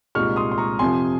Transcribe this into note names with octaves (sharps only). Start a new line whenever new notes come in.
C2 A#2 G#3 D#4 C#6 F6
C6 D#6
C6
A#5 C#6
F2 C3 F3 G#5 C6